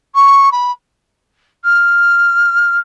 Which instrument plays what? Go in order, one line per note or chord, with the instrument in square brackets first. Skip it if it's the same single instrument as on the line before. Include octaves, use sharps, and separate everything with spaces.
[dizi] C#6
B5
F6